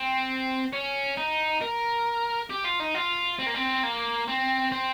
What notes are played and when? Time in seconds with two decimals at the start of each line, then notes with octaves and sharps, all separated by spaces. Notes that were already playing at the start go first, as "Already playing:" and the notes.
Already playing: C4
0.73 C#4
1.17 D#4
1.61 A#4
2.50 G4
2.65 F4
2.80 D#4
2.95 F4
3.39 C4
3.46 A#3
3.54 C4
3.83 A#3
4.28 C4
4.72 C4